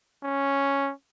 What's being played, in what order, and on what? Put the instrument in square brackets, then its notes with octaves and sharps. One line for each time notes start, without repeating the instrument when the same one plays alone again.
[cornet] C#4